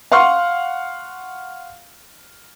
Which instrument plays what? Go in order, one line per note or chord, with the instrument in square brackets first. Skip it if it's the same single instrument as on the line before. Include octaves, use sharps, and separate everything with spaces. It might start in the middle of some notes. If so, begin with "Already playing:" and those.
[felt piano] F5 F#5 C6 C#6 F6